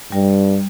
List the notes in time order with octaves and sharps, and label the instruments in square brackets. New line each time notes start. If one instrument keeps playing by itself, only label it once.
[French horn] G2 [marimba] G3